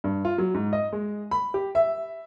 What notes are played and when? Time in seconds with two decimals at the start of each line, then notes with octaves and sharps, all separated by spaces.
0.04 G2
0.25 F4
0.38 F#3
0.54 G#2
0.73 D#5
0.93 G#3
1.31 B5
1.54 G4
1.75 E5